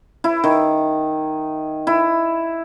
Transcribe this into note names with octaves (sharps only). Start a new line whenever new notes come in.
E4
D#3
E4